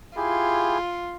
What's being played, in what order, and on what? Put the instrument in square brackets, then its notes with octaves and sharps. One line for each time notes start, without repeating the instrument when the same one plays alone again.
[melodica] E4 G4 G#4 [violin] F4